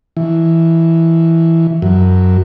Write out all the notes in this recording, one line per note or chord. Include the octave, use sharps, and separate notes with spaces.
E3
F#2